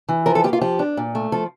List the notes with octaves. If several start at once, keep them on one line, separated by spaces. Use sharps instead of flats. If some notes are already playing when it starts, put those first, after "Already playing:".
E3
F3 A#4
A4
A#3 G4
F4
F3 G4
D4
A#2
A3
F3 A4